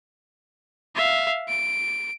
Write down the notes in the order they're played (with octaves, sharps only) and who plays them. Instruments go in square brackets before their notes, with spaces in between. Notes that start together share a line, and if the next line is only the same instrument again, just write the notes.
[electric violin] E5 F5
D7